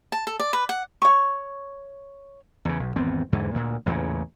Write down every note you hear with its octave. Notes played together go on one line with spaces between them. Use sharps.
A5
A4
D5
B4
F#5
C#5 C#6
E2 C#3
B1
G#1 E2 B3 C4
E2 G#2 D3 E3
D2 A#2
A1 E2 A#2 C#3